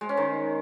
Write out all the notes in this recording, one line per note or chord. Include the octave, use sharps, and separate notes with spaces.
G#3
C#4
D#3